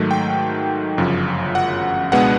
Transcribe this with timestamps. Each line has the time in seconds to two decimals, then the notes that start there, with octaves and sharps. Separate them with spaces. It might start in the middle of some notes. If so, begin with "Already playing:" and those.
Already playing: G#2 D#3 F#3 A3
0.11 G5
0.97 G1 F#2 C#3 F3
1.55 F#5
2.12 C#2 B2 G#3 B3 D4 F#5